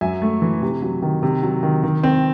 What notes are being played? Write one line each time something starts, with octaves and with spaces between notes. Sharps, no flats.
F#2 E5 G#5
A3
E3
C3
F#3
D#3
C3
F#3
D#3
D#3
C4